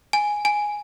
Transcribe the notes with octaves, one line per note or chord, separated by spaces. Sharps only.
G#5
G#5